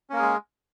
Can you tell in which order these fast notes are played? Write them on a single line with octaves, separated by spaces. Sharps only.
C#4 A#3 A#4 G#4 G#3